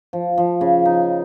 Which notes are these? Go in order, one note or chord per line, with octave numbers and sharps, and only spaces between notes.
F3
F3
C#3
D#4